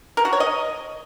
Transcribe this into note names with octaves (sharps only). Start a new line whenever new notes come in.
A#4
F#4
C#5
D#5